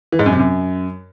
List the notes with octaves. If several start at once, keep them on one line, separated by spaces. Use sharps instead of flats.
E3
G#2
F#2
C3
F#2